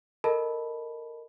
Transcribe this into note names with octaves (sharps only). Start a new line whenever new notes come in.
A4 A#4 D#5 A5 B5